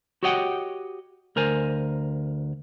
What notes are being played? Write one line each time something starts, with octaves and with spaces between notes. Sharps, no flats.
F#4 G4 C#5 D#5 F#5 G5
D2 A#4 C5 G#5